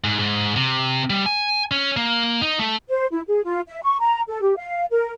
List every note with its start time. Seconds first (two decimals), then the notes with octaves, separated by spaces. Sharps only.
0.04 G#2
0.19 G#2
0.56 C3
1.10 G3
1.26 G#5
1.71 C#4
1.97 A#3
2.41 D#4
2.59 A3
2.89 C5
3.11 E4
3.27 G#4
3.44 F4
3.67 E5
3.82 C#6
4.00 A#5
4.28 A4
4.41 G4
4.57 F5
4.90 A#4